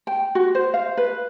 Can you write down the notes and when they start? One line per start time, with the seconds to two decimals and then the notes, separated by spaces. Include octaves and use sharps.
0.07 G5
0.35 F#4
0.55 C5
0.74 F5
0.97 B4